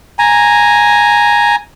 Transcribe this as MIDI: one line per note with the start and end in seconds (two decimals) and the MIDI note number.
0.19 1.56 80
0.19 1.56 82